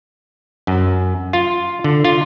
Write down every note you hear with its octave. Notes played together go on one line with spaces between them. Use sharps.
F#2
F4
D3
F4